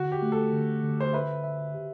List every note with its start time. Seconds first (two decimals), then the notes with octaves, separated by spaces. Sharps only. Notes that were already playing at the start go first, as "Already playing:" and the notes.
Already playing: D3 F#4
0.12 G4
0.22 A3
0.32 A4
0.53 D3
0.83 D3
1.00 C5
1.13 B4 E5
1.44 E5
1.74 G4